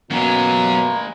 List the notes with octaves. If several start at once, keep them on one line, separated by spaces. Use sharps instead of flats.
F#2 B2 F#3 A3 A#3 G#5